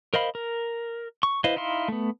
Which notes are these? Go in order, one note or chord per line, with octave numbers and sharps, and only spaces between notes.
A#4 C5 D#5 F5 B5
A#4
C#6
E4 B4 C5 D#5 F5
D#4 E4 F5 C6
A3 B3